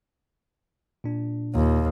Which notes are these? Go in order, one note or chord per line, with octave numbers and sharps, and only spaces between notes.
A#2 D4
D#2 A#2